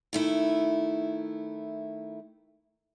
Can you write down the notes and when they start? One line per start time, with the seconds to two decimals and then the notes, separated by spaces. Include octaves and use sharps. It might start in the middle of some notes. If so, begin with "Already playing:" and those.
0.13 D#3 A3 E4